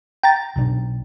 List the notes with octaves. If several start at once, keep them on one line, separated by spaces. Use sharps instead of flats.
G5 A#5 A6
B1 B2 D4